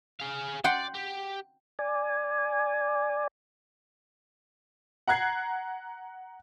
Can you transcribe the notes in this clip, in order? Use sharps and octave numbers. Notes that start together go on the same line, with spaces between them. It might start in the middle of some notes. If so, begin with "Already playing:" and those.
G#4 F5
D5 F#5 G5 C6
G4
D5 G#5
F#5 A#5 F#6 G#6 C7